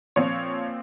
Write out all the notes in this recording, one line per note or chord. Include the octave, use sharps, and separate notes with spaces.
A#2 F3 C4 C#5